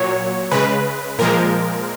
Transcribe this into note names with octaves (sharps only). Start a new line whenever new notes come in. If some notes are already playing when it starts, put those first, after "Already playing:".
Already playing: A#2 F#3 C#5
C#3 G#3 B4
A#2 F3 G#3 A#4